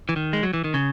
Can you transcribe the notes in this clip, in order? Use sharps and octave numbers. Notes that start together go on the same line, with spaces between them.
E3
D#3
G#3
F#3
E3
D#3
C#3